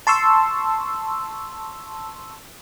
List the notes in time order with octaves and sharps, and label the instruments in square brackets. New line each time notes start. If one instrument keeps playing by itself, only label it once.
[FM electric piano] A5 C6 C#6 E6